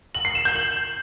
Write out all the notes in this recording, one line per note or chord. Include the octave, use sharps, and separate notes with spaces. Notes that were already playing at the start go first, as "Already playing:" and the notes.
F#7
C7
E7
G6
F#7